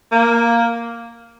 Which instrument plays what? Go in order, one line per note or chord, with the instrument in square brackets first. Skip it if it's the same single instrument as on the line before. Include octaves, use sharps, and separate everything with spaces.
[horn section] A#3